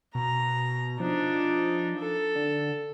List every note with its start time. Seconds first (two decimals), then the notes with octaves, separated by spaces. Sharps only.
0.15 B2 A#5
1.00 F3 D4 D#4
1.99 A4
2.35 D3